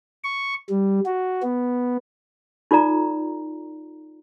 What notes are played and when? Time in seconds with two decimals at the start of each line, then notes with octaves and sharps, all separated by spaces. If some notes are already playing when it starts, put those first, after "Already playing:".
0.24 C#6
0.70 G3
1.06 F#4
1.43 B3
2.71 D#4 F4 A4 D5 A#5